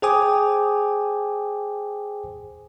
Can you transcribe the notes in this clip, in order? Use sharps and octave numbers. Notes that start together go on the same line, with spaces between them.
G#4 C5 G5 G#5 D6 D#6